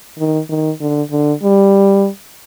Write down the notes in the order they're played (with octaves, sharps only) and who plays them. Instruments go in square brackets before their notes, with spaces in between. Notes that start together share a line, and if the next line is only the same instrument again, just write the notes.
[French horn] D#3
D#3
D3
D3
G3